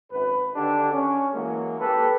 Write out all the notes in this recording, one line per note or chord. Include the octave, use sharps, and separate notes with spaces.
G#1 F#2 B4
D3 D#3 D4 G4
C#4
E3 F#3 G#3 A#3
A#3 G4 A4 B4